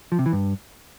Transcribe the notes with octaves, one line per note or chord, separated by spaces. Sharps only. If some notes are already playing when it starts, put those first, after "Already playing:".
F3
C3
E3
G2